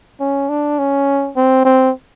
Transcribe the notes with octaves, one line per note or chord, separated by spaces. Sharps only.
C#4
D4
C#4
C4
C4